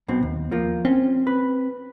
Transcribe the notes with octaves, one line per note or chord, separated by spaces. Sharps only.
B1 B2 C4
D#2
F3 A#3 F4
C4 C#4
B4